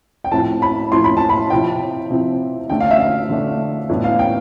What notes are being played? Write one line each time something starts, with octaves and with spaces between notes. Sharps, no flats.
G5
A2 F3 C4 E4 A5
B5
A2 F3 C4 E4 C6
B5
A5
B5
C3 F3 C4 E4 G5
C3 F3 C4 E4
D3 A3 D4 G5
F5
E5
F5
D3 A3 D4
A2 E3 B3 D4
F5
G5